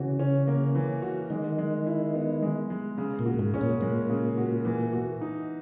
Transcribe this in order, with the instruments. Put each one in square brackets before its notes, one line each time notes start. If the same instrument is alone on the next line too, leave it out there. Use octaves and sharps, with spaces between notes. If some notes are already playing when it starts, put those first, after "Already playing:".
Already playing: [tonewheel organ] C#3 [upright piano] E3 F#4
[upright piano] C#4
A#3
E3
F#4
[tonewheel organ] D#3 [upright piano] G#3
[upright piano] G#3
E4
B3
G#3
G#3
C#3
[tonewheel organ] A#2
[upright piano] F#4
[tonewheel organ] G#2
[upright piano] C#4
[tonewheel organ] A#2
[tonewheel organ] A#2 [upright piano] G#3
[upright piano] C#3
F#4
E3
F#4
D#4